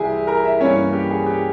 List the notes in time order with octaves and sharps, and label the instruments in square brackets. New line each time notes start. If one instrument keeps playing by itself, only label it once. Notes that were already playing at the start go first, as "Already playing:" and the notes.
Already playing: [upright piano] C2 C3 E3 G3 E4 G4 G#4 G#5
A#4 A#5
E4 E5
G2 E3 A#3 C#4 C#5
G4
G#4
G4